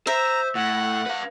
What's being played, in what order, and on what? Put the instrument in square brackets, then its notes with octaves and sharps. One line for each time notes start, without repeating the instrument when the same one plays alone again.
[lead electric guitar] C5 [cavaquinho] E5 [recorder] A#5
[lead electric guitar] A2 [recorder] F#5
[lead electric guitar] B4 F5